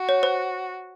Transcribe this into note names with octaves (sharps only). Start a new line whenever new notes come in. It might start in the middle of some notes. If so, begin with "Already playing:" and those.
Already playing: F#4
C#5
C5